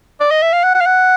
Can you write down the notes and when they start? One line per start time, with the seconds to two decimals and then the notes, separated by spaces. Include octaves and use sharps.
0.20 D5
0.31 D#5
0.42 E5
0.53 F5
0.64 F#5
0.75 F#5
0.81 F5
0.86 F#5